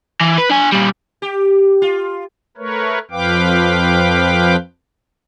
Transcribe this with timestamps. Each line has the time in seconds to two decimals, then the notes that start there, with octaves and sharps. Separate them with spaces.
0.21 E3
0.38 B4
0.50 D4 G#5
0.72 A#2 G3
1.22 G4
1.82 F4
2.57 A3 A#4 B4 C#5
3.11 F2 F3 B4 F5 G5 D6